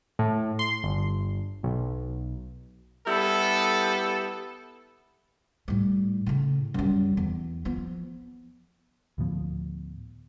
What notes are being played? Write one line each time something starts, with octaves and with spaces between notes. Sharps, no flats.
A2
C6
G1
B1
G3 B3 E4 A4
A2 G3
A2 C#3
F#2 G3
E2
F3 B3
D2 A2 F3 B3